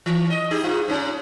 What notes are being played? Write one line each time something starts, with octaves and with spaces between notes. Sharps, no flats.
E3
D#5
D#4 G4 G#4
G#2 F4
G#2 C#4